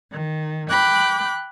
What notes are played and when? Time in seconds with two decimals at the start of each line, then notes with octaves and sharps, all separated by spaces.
0.11 D#3
0.69 G5 B5 D6 F#6 G6